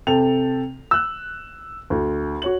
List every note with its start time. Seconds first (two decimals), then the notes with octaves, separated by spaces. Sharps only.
0.07 C3 A4 G5 F7
0.91 E6 F#6
1.90 D2
2.42 F#4 C#5 F#7